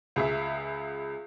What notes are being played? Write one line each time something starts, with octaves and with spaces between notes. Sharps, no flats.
C#2 G#4 E5